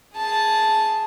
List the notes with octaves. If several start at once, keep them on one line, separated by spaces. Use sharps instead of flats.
G#4 A5